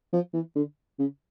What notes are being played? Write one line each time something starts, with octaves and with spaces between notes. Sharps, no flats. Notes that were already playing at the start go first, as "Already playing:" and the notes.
F3
E3
D3
C#3